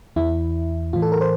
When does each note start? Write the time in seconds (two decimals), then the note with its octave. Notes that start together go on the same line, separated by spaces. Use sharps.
0.16 E2 E3 E4
0.93 A2 E3 F4
1.02 A4
1.12 A#4
1.21 C5